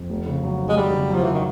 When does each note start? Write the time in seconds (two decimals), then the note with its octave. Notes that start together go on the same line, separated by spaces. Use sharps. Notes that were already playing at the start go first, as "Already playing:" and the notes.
Already playing: F2
0.10 F1
0.26 C#3
0.43 F#3
0.60 D#2
0.69 G#3
0.77 D#2 G3
0.93 C#3
1.10 F3 F#3
1.24 C#3 E3
1.33 D#3